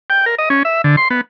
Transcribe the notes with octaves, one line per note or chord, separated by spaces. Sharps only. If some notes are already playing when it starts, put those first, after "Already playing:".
G5
A#4
D#5
C#4
E5
D3
C6
B3